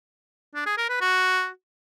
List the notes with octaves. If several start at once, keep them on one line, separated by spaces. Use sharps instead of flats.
D4
G#4
A#4
B4
F#4